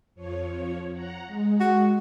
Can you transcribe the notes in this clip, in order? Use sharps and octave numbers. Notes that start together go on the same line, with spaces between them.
F2 F3 C#5
F#5 A#5
G#3
F#4